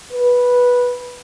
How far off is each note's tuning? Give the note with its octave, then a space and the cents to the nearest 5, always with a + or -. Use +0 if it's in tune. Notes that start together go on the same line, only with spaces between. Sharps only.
B4 -10